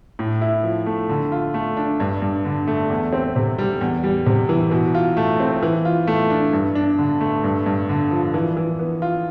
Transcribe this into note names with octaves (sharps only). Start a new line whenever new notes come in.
A2
E4
F3
A3
D3
F4
A3
D4
G2
G2
D3
A3
E2
C4
C3
G3
E2
G3
C3
E3
B2
F4
A3
C4
E3
F4
A3
D4
G2
D4
D3
A3
G2
G2
D3
F3
E3
E3
B3
F4